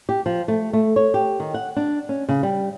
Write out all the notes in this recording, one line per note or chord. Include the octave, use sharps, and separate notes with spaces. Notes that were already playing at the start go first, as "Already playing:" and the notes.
G4
F3
A3
A3
C#5
G4
D#3
F#5
D4
C#4
C#3
G3